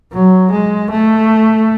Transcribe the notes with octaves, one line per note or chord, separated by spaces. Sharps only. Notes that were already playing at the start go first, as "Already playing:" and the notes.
F#3
G#3
A3